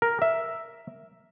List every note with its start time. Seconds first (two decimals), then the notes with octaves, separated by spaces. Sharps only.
0.02 A#4
0.22 E5